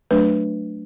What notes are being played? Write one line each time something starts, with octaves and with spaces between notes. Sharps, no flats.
F#3 A3 D4 B4